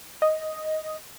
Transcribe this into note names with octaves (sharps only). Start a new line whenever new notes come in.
D#5